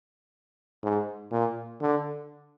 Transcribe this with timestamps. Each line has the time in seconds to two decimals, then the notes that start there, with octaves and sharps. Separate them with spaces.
0.83 G#2
1.31 A#2
1.81 D3